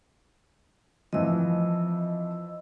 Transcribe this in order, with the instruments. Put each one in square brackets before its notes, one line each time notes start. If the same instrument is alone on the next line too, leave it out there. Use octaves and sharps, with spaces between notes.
[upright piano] F2 E3 F3 [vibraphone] D#5 E6